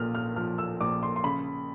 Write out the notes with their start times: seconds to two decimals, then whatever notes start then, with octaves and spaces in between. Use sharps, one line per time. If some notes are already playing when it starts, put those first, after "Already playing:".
Already playing: A#1 A#2 F6
0.15 F6
0.36 F3 F6
0.58 E6
0.81 A#1 D6
1.03 C6
1.16 C6
1.24 C#3 B5